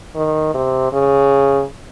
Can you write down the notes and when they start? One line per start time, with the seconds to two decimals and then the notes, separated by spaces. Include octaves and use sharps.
0.15 D#3
0.54 C3
0.93 C#3